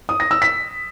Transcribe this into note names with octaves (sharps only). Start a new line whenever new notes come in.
D#6
A#6
E6
B6